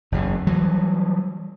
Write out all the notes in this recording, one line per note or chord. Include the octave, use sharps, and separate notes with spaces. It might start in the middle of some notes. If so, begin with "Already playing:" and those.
F#1 E2 C#3
E3 F#3 G3